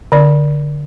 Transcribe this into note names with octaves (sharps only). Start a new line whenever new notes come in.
D3 D5